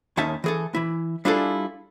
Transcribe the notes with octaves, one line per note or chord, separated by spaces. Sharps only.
D#2 C#4 D#4 E5 A5
E3 G#4 A4
E3 E4
G3 D4 E4 F4 G#4 A4